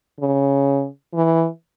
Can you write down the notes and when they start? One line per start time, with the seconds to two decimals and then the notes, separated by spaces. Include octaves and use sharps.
0.20 C#3
1.14 E3